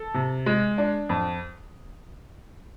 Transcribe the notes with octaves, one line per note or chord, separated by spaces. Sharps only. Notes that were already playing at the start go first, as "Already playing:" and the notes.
Already playing: A4
C3
G#3
D4
F2